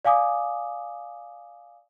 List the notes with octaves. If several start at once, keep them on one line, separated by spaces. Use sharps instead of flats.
D5 F5 G#5 D6 D#6